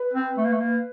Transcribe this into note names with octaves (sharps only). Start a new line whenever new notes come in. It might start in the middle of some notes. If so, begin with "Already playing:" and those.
Already playing: B4
C4
A3
A#3
A3
A#3